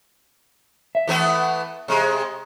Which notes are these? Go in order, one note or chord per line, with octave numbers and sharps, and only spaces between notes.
E5
E3 A3 B3
C3 G#3